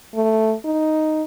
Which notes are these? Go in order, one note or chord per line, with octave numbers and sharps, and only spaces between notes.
A3
D#4